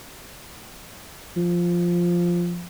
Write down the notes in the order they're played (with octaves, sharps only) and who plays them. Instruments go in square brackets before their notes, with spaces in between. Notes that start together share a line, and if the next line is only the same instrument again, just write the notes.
[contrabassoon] F3